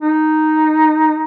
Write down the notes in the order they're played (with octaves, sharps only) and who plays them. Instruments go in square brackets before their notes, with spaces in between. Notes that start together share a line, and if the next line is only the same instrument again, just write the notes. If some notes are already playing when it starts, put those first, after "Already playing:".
[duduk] D#4